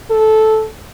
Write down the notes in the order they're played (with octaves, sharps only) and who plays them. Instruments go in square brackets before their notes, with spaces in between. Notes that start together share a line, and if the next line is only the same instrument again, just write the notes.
[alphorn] A4